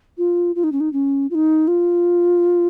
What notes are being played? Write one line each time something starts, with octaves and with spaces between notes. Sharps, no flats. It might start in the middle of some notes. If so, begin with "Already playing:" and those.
F4
F4
D#4
C#4
D#4
C#4
F4
D#4
F4